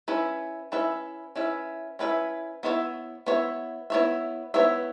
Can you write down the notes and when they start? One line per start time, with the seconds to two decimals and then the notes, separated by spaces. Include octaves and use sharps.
0.08 C#4 E4 B4 E5
0.72 C#4 E4 B4 E5
1.36 C#4 E4 B4 E5
1.99 C#4 E4 B4 E5
2.63 B3 E4 C#5 E5
3.26 B3 E4 C#5 E5
3.90 B3 E4 C#5 E5
4.54 B3 E4 C#5 E5